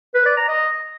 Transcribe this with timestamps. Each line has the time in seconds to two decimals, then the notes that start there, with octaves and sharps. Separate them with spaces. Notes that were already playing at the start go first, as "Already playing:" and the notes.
0.15 B4
0.26 D5
0.37 A#5
0.48 D#5